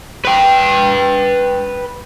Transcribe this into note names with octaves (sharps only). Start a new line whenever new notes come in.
B4 G5